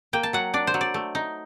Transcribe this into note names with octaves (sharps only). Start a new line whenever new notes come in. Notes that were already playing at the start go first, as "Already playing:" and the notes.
A#3 G5
A5
F#3 F#5
D4 D5
C5
F#3
D5
A3
D#4